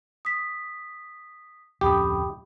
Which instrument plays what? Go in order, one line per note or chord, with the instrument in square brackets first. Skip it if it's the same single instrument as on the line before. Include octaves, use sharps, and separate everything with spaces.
[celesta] D#6 B6
[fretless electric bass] D1 F2 C#4 [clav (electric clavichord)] G4 [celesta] G5 B5 D#6